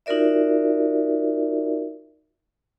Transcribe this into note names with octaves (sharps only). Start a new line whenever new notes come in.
D#4 F4 F#4 A#4 D5 E5